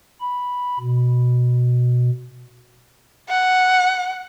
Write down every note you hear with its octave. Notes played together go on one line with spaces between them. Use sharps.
B5
B2
F#5